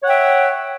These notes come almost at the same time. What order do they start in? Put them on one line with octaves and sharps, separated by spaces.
C#5 F#5 G5 E5